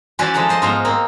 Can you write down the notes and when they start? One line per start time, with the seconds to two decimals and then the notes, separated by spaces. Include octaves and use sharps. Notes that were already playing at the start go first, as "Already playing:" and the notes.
0.19 E3 C#4 F#4 B4 C5 D5
0.34 F3 G#3 A4 F#5 A#5
0.49 C5 D#5 C6
0.62 G#2 B3 F4 C5 F#5 A#5
0.85 A#3 C4 D#4